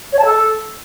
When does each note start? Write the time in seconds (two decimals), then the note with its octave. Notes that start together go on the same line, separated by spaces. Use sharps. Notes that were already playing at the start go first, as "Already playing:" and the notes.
0.12 C#5
0.18 A5
0.25 A4